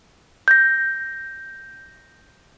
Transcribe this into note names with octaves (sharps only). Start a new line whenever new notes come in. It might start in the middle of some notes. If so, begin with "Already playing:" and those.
G6 A#6